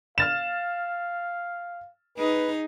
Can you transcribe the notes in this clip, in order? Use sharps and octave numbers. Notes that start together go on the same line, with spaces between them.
F5 F6 A6 E7
D#4 G#4 B4